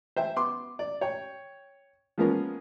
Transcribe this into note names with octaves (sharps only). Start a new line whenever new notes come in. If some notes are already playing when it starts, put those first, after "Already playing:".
C5 E5 G5
B3 C6 D6
D5
C#5 G5
F3 G#3 A#3 B3 C#4 A#4